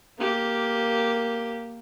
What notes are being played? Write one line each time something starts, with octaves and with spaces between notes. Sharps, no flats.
A#3 G4